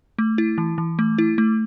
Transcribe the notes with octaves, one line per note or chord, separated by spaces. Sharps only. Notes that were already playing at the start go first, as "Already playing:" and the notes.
A3
E4
E3
E3
A3
E4
A3